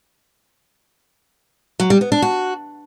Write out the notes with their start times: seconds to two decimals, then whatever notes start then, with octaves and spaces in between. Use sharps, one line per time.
1.80 F#3
1.90 G3
2.01 B3
2.12 D4
2.22 F#4